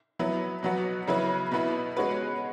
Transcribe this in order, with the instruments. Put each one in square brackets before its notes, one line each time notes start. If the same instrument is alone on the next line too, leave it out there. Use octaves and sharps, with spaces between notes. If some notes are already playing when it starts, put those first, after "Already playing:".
[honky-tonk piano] F#3 B3 E4
B2 F#3 B3 F#4
C#3 F#3 E4 B4
B2 B3 E4
G#3 C#4 F#4 B4